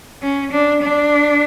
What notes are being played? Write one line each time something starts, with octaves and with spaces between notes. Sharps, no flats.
C#4
D4
D4